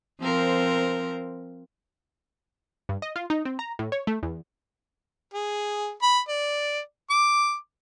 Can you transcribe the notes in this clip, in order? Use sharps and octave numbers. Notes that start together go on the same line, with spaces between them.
F3 C4 A#4
G2
D#5
F4
D#4
C4
A#5
A2
C#5
A3
E2
G#4
B5
D5
D6